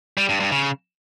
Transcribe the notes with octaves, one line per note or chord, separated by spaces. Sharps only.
G3
G2
G2
C#3